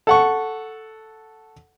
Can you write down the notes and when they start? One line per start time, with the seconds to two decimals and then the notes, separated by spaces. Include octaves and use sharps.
0.07 A4 F#5 C#6